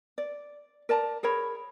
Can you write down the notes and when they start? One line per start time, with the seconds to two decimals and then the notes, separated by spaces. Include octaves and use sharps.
0.18 D5
0.89 A#4 D5 A5 A#5
1.23 G#4 A#4 C#5 B5